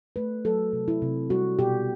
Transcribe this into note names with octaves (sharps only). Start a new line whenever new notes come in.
A3 B4
F#3 A4
C3
E4
C3
G3 F#4
B2 G4